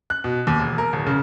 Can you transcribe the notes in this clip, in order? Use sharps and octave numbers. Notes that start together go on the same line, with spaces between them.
F#6
B2
D#2
E1
A#4
D1
C#3